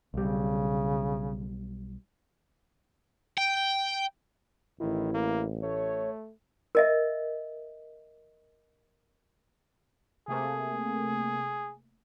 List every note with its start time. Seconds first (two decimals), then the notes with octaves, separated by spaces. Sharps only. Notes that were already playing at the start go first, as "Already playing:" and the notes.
0.14 B1 C#3 G3
3.38 G5
4.80 A1 D#3 E4
5.14 A#3
5.62 A3 C#5
6.75 A#4 D#5 E5
10.28 C3 A3 A#3 G#4